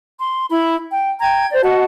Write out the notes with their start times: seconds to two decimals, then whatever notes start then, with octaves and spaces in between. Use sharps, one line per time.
0.20 C6
0.50 E4 B5
0.91 G5
1.21 G5 A#5 G#6
1.52 C5 D5
1.63 F#4 D#5 F#5 A5